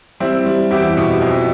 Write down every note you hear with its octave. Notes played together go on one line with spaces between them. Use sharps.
G3 C4 E4
G3
E2 E4 G4
B2
F2